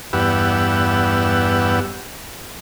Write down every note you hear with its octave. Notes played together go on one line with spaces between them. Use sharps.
E2 G2 B3 G4 F#5 E6